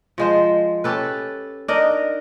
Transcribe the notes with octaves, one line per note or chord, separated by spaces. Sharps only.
F3 G#3 C5
C#4 G4 A4 B4
D4 D#4 A#4 D#5